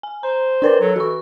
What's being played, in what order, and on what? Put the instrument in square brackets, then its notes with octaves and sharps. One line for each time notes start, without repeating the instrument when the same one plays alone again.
[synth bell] G#5
[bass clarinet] C5 [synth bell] A#5
[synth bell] D4 A#4 B4 [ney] D5
[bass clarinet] F#3 [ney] A4
[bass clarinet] E3 [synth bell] F#4 C#6